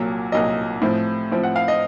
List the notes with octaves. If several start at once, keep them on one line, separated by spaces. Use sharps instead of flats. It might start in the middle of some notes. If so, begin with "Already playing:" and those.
Already playing: C2 A#2 F#3
C2 A#2 F#3 D#5
A2 F3 C4
A2 F3 C4
F#5
F5
D#5